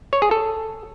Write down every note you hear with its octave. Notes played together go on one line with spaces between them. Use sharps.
C#5
G#4
A4